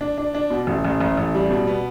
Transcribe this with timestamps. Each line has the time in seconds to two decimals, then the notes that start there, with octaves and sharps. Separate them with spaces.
0.01 D4
0.18 D4
0.35 D4
0.51 B2
0.67 A1
0.84 A1
1.00 A1
1.17 A1
1.35 G3
1.51 B2
1.67 B3